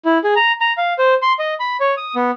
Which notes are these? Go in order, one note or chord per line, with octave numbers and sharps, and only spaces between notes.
E4
G#4
A#5
A#5
F5
C5
C6
D#5
B5
C#5
D#6
B3